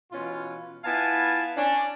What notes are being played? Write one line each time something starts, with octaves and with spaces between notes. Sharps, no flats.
B2 E3 C#4 F4
B3 E4 F4 F5 G#5 A5
C#4 D4